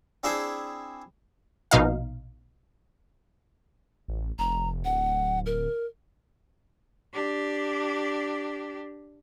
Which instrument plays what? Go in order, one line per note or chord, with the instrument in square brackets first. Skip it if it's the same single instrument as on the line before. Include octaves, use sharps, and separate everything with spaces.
[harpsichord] C4 D4 E4 G#4 C5
[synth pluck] A#1 B2 D#4 F5
[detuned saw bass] A1
[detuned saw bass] F1 [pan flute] A#5
[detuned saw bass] D1 [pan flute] F#5
[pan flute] A#4
[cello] D4 G4